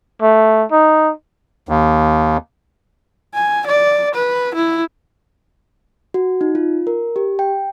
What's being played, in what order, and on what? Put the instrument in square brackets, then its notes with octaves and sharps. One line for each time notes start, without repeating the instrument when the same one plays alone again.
[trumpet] A3
D#4
[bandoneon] D#2
[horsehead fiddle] G#5
D5
B4
E4
[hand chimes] F#4
D#4
F4
A#4
G4
G5